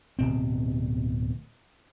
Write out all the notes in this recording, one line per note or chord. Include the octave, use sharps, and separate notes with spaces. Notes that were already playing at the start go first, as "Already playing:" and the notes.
D1 B2 C4